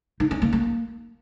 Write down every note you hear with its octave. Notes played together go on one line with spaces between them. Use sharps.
D#4
C#4
A#3
A#3